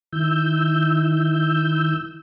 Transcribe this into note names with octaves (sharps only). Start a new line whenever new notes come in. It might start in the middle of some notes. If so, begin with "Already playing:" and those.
D#3 E4 E6 G6